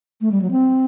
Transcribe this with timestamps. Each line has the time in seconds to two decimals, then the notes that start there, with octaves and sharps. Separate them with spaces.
0.21 A3
0.32 G3
0.42 F#3
0.51 C4